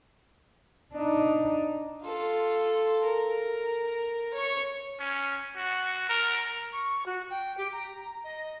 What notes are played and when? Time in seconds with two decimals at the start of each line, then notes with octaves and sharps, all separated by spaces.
0.94 D4 D#4
2.03 F4 A4
3.04 A#4
4.34 C#5 C#6
4.99 C#4
5.56 F#4
6.09 A#4
6.73 C#6
7.06 F#4
7.30 G5
7.58 G4
7.72 A#5
8.24 D#5